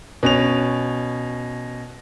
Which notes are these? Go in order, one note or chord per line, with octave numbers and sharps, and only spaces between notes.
B2 C#4 F7